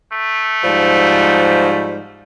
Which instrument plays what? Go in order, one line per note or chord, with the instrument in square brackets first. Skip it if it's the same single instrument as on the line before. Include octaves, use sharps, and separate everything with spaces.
[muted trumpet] A3
[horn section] G#2 F3 G3